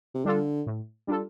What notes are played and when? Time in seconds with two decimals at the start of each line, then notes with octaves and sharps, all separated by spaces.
0.14 C3
0.25 D3 G3 D4 F4 A4
0.66 A2
1.07 G3 D4 F4 A4